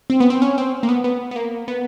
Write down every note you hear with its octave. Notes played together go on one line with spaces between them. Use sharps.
C4
B3
C4
C#4
C4
A#3
B3
B3
B3
A#3
B3